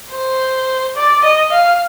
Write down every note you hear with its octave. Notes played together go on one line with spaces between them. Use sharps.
C5
D5
D#5
F5